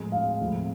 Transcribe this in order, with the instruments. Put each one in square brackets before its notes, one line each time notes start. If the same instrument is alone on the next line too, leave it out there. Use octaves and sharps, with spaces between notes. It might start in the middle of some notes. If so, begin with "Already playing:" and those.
Already playing: [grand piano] A2 F3 G#3 C4
[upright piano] F5
[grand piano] A2 F3 G#3 C4 E4